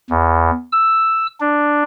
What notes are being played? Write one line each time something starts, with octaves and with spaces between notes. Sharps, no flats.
E2
E6
D4